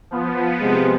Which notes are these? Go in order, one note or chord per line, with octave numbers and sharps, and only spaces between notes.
F3 B3
C3 G#3